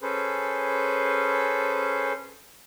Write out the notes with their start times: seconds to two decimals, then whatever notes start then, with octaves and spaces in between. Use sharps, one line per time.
0.02 C#4 G#4 A4 B4 C5